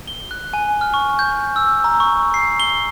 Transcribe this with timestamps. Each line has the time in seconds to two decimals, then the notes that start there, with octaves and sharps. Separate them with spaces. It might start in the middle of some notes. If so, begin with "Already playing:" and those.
0.07 G7
0.31 F#6
0.54 G#5
0.81 F6
0.94 C#6
1.19 G6
1.32 G6
1.56 E6
1.84 A#5
2.00 C#6
2.34 C7
2.60 G7